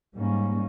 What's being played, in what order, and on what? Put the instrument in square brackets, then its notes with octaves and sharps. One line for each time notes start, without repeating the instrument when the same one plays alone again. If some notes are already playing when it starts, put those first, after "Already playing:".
[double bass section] G#2 G3 A#3 C#4